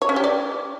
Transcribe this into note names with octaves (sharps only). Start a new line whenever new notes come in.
C#5
C#4
G4
D5